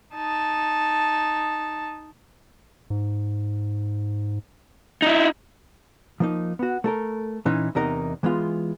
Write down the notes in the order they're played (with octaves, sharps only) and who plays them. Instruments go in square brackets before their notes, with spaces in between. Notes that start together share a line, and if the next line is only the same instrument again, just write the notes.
[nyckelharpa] D#4 A5
[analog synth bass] G#2
[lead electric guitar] D#4 E4
[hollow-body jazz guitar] F3 A#3 D#4
B3 F#4
A3 A4 A#4
A#2 E3 C#4 D#4
E2 C3 D#4 A#4 D#5
E3 G#3 B3 F4